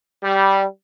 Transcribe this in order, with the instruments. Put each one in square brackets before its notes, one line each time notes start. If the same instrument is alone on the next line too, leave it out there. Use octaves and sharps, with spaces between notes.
[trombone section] G3